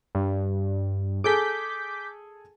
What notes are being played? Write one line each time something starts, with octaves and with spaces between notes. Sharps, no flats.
G2
G#4 A4 G#5 D6 G6 B6